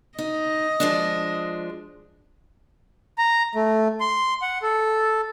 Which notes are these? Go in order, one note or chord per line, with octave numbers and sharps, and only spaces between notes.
D#4 D#5
F3 G#3 D4
A#5
A3
C6
F#5
A4